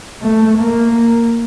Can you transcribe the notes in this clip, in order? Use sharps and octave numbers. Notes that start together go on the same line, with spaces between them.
A3
A#3